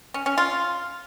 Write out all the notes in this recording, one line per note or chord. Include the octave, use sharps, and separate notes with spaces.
C#4
C#4
F4